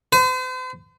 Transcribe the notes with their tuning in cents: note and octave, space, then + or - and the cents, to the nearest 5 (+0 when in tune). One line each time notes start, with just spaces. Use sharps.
C5 -45